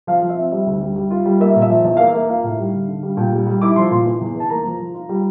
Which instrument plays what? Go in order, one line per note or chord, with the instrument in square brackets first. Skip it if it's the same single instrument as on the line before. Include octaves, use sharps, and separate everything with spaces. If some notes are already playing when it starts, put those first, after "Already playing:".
[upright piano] F3 F5
F3
E5
C4
G3 E5
D2
G3
G3
F4
G3
A#3 E5
A#2
E5
F3
E2 E5
A#3 F5
E5
A#3
F4 F5
A2
G3
D3
D3
G3
A#2 G5
G3
G3
E4 D6
F3 C6
A#2 C6
E3
E2
E3 A5
A#3 A#5
F3
F3
F4
G3